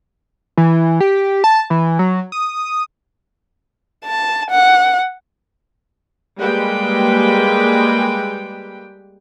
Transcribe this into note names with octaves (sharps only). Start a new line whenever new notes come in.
E3
G4
A5
E3
F#3
D#6
A5
F#5
G3 G#3 A#3 B4 G5